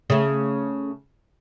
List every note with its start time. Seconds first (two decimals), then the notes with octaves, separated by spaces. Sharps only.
0.10 C#3 A3